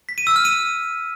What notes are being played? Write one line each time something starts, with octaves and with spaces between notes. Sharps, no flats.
B6
D#7
E6
F6
D#7